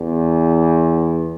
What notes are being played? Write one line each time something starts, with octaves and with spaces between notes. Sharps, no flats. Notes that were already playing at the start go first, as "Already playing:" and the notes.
Already playing: E2